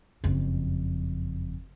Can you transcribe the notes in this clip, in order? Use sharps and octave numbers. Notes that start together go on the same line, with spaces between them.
F#1 F2